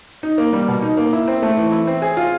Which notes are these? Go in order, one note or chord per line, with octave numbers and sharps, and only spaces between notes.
D#4
A#3
G3
B2
D#4
A#3
E4
C4
A3
E3
E4
C4
G#4
F4